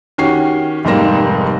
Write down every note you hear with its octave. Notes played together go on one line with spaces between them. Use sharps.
D#3 C#4 F#4 G4 C7
F1 G#2 G3 A#3 A#6 E7